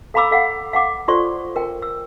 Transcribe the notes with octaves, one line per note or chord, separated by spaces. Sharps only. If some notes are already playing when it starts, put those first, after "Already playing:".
A4 F5 A#5 B5 D6 E6
A4 F5 F#5
F5 F#5 D6
F4 A4 C5 D5 C6 C#6
A#4 G5
E6